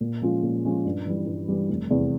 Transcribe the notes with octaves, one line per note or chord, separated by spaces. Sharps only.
A#2
F3 G#3 C#4 F4
A#2
F3 G#3 C#4 F4
G2
E3 G3
G2
E3 G3
F1
E2 C3